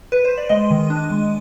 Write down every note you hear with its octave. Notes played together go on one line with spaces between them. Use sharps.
B4
C5
D5
G#3 D#5
D#3
D4
G#3